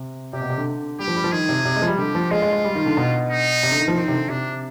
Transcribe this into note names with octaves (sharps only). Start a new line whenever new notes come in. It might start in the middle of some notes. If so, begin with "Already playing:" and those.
Already playing: C3
C3 G4
B2
C3
D3
G3 G4
F3
G3
F3
D#3 G#4
C3
C3
G#3
F3
G3
D3 G4
F3
G#3 F4
G#3
G#3
G3
D#3
D3
B2
D#4
C3
D3
D#3
F3
D#3 C4
C3
D3
C3 D4